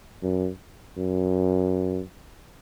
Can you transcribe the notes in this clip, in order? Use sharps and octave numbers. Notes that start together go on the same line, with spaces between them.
F#2
F#2